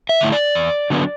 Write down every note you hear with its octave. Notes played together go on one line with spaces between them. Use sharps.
E5
D3 A3 E4
D5
E2
D3 F#3 B3 D4